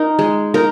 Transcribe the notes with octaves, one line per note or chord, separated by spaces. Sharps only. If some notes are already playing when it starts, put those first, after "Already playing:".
Already playing: D#4 A#4
G#3
D#4 A#4